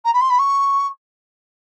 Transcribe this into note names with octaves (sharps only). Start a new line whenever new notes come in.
A#5
B5
C6
B5
C#6